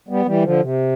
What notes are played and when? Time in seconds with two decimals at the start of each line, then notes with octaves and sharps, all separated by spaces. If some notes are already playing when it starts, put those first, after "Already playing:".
0.08 G3 B3
0.25 E3 G3
0.43 D3 F3
0.60 C3